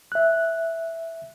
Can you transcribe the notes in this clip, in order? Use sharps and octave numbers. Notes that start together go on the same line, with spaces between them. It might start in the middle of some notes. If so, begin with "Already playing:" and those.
E5 F#6